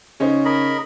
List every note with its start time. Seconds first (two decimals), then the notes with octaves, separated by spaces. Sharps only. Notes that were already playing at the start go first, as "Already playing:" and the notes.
0.20 C#3 C#4 D#4 C5
0.45 A#4 D#5 B5